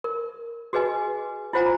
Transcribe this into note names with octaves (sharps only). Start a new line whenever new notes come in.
A#4
F#4 G#4 B4 D#5 G#5
E4 F4 C5 F#5 G#5 A#5